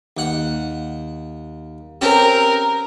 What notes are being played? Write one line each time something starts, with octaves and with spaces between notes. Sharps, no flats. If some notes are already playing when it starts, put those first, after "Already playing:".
D#2 F#5
C4 C#4 G4 A#4